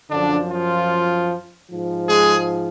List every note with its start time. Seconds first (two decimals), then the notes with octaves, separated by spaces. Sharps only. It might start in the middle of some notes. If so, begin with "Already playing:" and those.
0.11 F#2 D3 F3 D4
0.50 F3 F4
1.69 G#2 F3
2.08 G#3 G#4